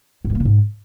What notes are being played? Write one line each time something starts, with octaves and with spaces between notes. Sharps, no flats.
G#2
G2
A#3
C#3
G#2